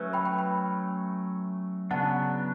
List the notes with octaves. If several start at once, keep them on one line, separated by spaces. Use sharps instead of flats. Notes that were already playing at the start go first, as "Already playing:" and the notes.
Already playing: F#3 A3 C#4 B4
G5 B5
G5 B5
G5 B5
C#3 F#3 B3 D4 F#5 A5